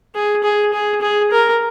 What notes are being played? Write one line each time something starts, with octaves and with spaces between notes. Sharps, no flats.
G#4
G#4
G#4
G#4
A#4